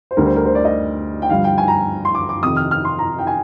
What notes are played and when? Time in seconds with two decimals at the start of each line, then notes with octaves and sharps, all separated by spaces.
0.11 C5
0.17 D2 D3 G3 D4 A#4
0.27 C5
0.36 A#4
0.45 C5
0.55 D5
0.65 D#5
1.22 G5
1.30 G2 D3 F3 F5
1.44 G5
1.58 G#5
1.68 A#5
2.05 C6
2.15 D6
2.29 D6
2.43 F2 C3 D#3 D#6
2.57 F6
2.71 F6
2.85 C6
2.99 A#5
3.19 G5
3.27 G#5